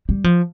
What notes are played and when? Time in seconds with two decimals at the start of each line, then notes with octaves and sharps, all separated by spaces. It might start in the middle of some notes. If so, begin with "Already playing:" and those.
0.09 G3
0.24 F3